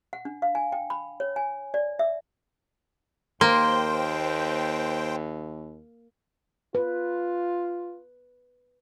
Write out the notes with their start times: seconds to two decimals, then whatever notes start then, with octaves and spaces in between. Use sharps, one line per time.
0.13 F#5
0.25 D4
0.42 F5
0.55 G#5
0.72 G5
0.90 B5
1.20 C#5
1.36 G#5
1.74 D5
1.99 E5
3.41 D#2 A#3 C5 G5 C6
6.75 F4 B4